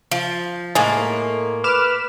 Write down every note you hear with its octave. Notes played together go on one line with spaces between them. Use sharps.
F3
A2 G#3 A#3
B4 D6 F6 E7